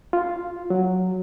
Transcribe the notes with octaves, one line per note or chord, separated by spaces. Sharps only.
F4
F#3